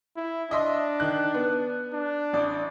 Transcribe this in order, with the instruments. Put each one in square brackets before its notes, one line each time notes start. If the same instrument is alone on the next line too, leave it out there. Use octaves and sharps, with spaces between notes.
[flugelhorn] E4
[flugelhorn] D4 [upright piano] D#5 E5 C6
[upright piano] D#3 F#6
B3
[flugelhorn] D4
[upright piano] A1 D5